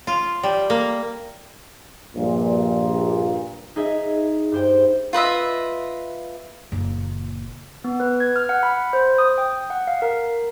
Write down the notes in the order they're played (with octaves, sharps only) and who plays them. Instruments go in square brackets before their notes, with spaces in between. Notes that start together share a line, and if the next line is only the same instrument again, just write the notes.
[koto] F4
G3
A#3
[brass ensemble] A#1 G2 A#2
[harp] D#4 G#4 D#5 E5
G2 C5 G5
[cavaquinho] F4 B4 D#5 E5
[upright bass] F#1 A#2
[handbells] B3
B4
G#6
F6
F#5
B5
C5
D#6
G5
F#5
F5
A#4